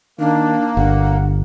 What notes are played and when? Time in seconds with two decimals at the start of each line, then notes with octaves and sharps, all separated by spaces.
0.20 D#3 A#3 D4
0.77 G1 D4 F#5